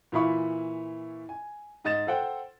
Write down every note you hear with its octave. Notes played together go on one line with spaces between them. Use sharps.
A#2 E3 E4 F5 B5 C#6
G#5
G#2 D#5 A6 E7
A4 C5 F#5 G5